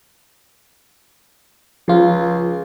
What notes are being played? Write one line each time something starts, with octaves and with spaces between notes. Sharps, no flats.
C#2 F3 F4